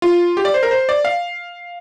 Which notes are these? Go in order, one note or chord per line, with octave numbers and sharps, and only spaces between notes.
F4
G4
D5
C5
A#4
C5
D5
F5